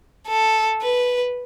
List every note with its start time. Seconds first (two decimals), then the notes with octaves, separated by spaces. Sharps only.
0.28 A4
0.82 B4